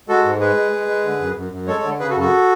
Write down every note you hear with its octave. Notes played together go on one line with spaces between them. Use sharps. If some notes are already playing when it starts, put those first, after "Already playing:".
G#3 F#4 A4
G#2
G#3 G#4 B4
G#3
G#3
G#3
D3
F#2
F#2
F#2
G#3 A4 C#5
D3
C#3 G#4 B4
F#4 A4
F#2
F#4 A4